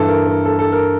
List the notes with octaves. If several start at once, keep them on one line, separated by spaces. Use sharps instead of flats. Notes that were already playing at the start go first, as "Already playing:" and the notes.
Already playing: G2 E3 A4
A#4
A#4
A4
A4
A#4